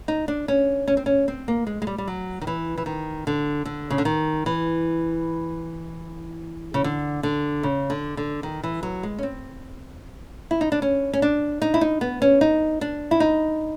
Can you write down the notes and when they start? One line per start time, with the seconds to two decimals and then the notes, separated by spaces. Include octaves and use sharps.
0.08 D#4
0.28 D4
0.48 C#4
0.88 C#4
0.97 C4
1.06 C#4
1.28 C4
1.48 A#3
1.67 G#3
1.82 G#3
1.87 G3
1.98 G3
2.08 F#3
2.41 D#3
2.47 E3
2.78 E3
2.86 D#3
3.27 D3
3.65 D3
3.90 C#3
3.98 D3
4.05 D#3
4.46 E3
6.74 C#3
6.84 D3
7.23 D3
7.63 C#3
7.90 D3
8.17 D3
8.43 D#3
8.63 E3
8.83 F#3
9.03 G#3
9.19 C#4
9.23 C4
10.51 E4
10.61 D#4
10.72 D4
10.82 C#4
11.13 C#4
11.22 D4
11.62 D#4
11.74 E4
11.81 D#4
12.01 B3
12.22 C#4
12.41 D#4
12.81 D4
13.11 E4
13.20 D#4